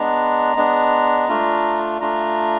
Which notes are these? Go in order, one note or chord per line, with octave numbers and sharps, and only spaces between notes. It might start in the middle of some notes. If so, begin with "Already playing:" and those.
Already playing: G#3 B3 D4 A#5
G#3 B3 D4
A3 D4 F4
A3 D4 F4 A#5